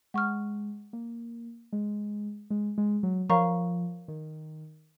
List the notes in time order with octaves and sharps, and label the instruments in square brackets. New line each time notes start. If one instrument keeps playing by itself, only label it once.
[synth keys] G#3 [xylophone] F#5 C#6 F6
[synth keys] A#3
G#3
G#3
G#3
F#3
[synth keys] F3 [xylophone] A#4 C#5 F5 A#5 C#6
[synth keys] D#3